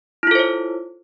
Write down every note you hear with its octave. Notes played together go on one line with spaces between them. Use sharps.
E4 F4 A4 C5 C#5